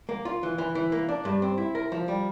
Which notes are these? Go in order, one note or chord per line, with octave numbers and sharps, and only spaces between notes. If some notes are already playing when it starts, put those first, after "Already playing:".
A#3
F4
E3
E3
E3
A#3
D4
G2
C4
E4
A#4
F3
G3